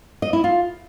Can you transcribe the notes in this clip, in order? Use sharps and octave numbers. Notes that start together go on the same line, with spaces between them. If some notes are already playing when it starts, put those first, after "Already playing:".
D#5
E4
F4